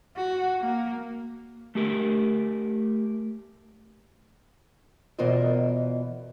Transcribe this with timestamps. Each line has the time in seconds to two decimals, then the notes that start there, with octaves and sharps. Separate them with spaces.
0.17 F#4
0.61 A#3
1.75 A3 G4 A#4
5.19 E2 B2 F4 A#4 C5 D#5